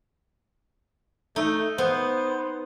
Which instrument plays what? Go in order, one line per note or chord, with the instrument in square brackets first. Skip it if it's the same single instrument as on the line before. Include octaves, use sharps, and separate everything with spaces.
[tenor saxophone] A3 [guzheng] D#4
[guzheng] B3 [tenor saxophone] C5